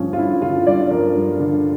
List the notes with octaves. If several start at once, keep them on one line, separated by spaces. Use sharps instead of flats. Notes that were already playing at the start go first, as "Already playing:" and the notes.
Already playing: G2 D3 F3 C#4
F4
G2 E4
D3 F4
G2 D5
F3 A#4
G2
D3